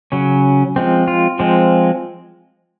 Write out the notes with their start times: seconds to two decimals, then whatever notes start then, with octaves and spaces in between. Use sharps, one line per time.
0.12 C#3 F#3 C#4
0.76 F3 G#3 C4
1.08 F4
1.39 F3 G#3 C4